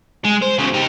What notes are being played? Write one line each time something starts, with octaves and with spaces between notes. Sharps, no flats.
G#3
C5
E2 C#3
D#4 G4